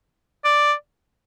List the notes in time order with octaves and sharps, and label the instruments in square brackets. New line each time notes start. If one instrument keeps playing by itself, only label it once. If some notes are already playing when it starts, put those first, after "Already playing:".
[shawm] D5